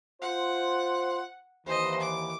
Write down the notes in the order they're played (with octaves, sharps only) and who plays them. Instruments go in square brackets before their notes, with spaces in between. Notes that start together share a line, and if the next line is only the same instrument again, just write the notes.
[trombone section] F4 C5 [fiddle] F#5
[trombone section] D#2 E3 [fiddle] C5 D#5
[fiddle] D6